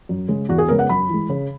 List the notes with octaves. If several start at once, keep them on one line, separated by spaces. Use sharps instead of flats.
F#2
C#3 G#3
E2 F#4
G#4
C#3 G#3 B3 A#4
F#5
F#2 B5
E3 G#3
C#3